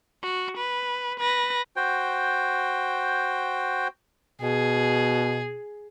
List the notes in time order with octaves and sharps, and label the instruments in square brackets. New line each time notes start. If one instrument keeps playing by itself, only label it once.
[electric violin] F#4
B4
B4 A#6
[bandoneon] F#4 C5 G5
[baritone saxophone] B2 [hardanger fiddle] G#4